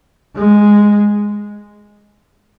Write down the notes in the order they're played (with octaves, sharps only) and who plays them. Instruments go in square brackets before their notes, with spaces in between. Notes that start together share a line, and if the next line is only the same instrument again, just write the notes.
[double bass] G#3